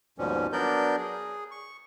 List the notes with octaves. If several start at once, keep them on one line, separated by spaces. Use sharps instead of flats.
D#2 G#2 B2 F3 G3 C#4
F#3 B3 D4 A#4 D5 G6
G#4
C#6